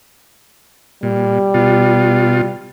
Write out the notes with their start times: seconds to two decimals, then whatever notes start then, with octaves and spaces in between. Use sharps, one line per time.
1.03 A#2 G3
1.54 B2 F4